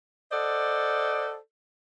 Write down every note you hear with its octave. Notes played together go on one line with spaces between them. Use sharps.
A4 C5 D5 D#5 F#5